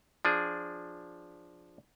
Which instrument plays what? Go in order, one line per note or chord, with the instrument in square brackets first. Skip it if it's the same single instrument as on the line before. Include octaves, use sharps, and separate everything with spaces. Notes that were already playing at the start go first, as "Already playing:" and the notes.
[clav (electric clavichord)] F3 D4 G#4